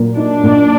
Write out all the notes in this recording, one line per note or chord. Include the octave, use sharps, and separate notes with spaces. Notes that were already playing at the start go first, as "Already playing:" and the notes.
Already playing: A#2 F#3 A#3
D4 D#4
A#2